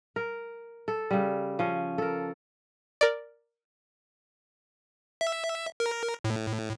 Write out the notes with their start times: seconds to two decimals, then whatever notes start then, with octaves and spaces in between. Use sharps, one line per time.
0.16 A#4
0.88 A4
1.11 C#3 G3
1.59 F3 C#4
1.98 A4 A#4
3.01 A#4 D5
5.21 E5
5.80 A#4
6.24 A2